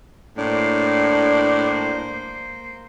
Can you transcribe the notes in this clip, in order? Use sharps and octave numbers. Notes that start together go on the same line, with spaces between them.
A2 A#3 D4 C5